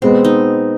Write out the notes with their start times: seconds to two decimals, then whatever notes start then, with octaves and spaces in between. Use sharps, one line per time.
0.02 B2 G#3 B3 C4
0.25 D#4